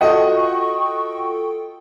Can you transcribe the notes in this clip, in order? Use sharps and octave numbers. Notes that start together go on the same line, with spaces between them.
F4 F#4 A4 D#5 F#5 G5 C#6